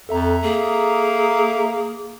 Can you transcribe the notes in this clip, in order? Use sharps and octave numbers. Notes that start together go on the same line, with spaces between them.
F2 A4 E5 A#5
A#3 G#4